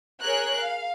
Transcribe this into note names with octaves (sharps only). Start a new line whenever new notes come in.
G#4 A#4 C#5 F#6
F5